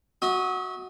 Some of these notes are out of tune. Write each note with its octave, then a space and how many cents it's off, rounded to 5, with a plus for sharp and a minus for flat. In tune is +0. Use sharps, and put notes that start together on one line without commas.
F#4 -5 E5 -40 D#6 +0